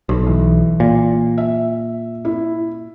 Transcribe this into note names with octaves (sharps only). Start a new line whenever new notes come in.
B1
E3
A#2
E5
E4